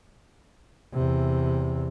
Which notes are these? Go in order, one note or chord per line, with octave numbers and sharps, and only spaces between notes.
E2 C3